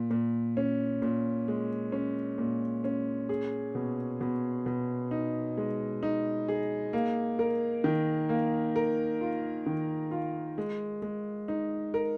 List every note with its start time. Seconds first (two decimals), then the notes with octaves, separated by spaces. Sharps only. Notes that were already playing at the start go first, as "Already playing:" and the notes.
Already playing: A#2
0.11 A#2
0.57 C#4
1.02 A#2
1.48 G#3
1.92 C#4
2.38 A#2
2.84 C#4
3.29 G#4
3.75 B2
4.21 B2
4.66 B2
5.11 D#4
5.57 G#3
6.03 D#4
6.48 G#4
6.93 A#3
7.39 A#4
7.84 D#3
8.29 A#3
8.76 A#4
9.21 F4
9.66 D#3
10.11 F4
10.58 G#3
11.02 G#3
11.48 D#4
11.94 A#4